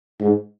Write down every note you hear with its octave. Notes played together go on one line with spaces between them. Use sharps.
G#2